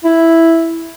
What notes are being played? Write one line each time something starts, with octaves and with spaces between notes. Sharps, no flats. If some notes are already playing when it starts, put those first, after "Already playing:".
E4